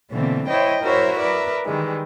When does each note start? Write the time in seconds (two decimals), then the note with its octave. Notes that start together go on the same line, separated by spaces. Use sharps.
0.10 B2 D3 E3 A#3 C4
0.48 E4 C5 C#5 D#5 G5
0.83 E4 F#4 A#4 C5 C#5 E5
1.18 A#4 B4 D5 E5
1.65 D#3 E3 G3 G#3